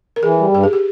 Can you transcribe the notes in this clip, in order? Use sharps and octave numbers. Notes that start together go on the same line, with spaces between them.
A#4
E3 G#4
G3
G2 G4
G#4
G4